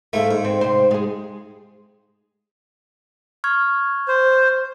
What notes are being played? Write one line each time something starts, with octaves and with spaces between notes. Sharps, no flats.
G#2 A3 A#3 A4
G#2
C4
C3 C5
G#3 G#4
C#6 F6 G#6
C5